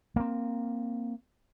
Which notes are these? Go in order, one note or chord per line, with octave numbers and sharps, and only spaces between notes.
A#3 C4